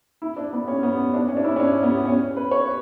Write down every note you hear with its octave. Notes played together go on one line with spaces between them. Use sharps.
E4
D4
B3
C#4
B3
D4
C#4
D4
E4
C#4
D4
B3
C#4
B4
C#5